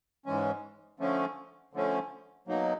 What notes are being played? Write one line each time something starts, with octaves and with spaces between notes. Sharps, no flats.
G#2 E3 G#3 C#4
D3 F3 A3 C#4
D3 F3 A3 C#4
B2 F#3 A#3 D#4